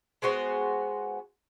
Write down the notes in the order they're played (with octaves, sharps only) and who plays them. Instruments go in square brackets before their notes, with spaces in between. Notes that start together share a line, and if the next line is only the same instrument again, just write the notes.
[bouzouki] G#3 B3 F#4 C5